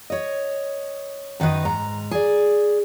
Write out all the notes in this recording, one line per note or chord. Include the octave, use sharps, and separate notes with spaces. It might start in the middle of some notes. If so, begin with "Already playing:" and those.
C#5 D#5
F#2 D#3 D#4 B4 D#5
G#2 A#5
G#4 D5